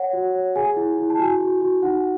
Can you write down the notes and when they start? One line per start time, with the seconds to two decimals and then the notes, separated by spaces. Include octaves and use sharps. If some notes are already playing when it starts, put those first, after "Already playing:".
Already playing: C#5 F#5
0.13 F#4
0.35 C#5
0.56 G#4 G#5
0.76 E4
0.98 E4
1.10 A5
1.19 F#4 G#5
1.41 F#4
1.61 F#4
1.82 D#4 F#5